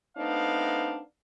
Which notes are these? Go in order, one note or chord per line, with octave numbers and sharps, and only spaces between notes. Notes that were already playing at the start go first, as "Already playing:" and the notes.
A3 B3 C4 D4 D#4 F5